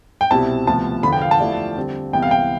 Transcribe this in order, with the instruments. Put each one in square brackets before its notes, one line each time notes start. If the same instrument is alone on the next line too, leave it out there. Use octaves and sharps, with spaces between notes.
[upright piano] G5
[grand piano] C2 B2 G3 C4 E4 [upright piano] A5
[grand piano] D2 C3 F3 B3 [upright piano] A5
[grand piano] E2 D3 F3 B3 [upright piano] B5
[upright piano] G5
F5
A5
[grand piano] F3 A3 E4 G4 D5
D3 G3 C4
[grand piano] C2 C3 E3 B3 [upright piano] G5
[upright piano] F5
G5